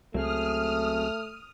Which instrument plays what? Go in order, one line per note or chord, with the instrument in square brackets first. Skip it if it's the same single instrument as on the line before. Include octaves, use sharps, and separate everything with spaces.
[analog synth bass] C#2 [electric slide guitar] F#3 C4 G#4 [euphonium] A3 [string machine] D#6 F6